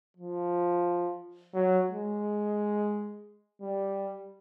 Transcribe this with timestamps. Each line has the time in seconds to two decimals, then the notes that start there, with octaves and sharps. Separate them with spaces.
0.17 F3
1.54 F#3
1.89 G#3
3.61 G3